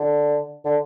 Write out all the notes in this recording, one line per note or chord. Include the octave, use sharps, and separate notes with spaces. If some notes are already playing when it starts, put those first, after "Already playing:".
Already playing: D3
D3